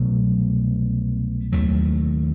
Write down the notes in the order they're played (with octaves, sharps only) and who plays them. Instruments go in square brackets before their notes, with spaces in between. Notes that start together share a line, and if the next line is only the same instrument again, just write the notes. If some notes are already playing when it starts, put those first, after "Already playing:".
Already playing: [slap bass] C2 B2 F#3 A3
D#2 D#3 F#3 A3